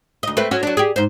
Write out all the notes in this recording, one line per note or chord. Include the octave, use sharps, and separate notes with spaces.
D2 D#5
A3 C4 B4
F#3 C#4 F#4
F#3 D4
G4 G#4
G#2 C5